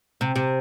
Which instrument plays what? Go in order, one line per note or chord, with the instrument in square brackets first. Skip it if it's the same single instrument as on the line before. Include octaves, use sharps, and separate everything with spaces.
[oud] C3
C3